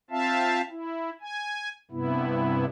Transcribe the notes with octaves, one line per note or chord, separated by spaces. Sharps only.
C4 F4 E5 F5 A5
E4
G#5
G2 C3 B3 E4